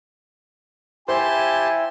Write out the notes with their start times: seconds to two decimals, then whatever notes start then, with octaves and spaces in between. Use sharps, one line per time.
1.08 E4 G4 C5 G#5 A5 C6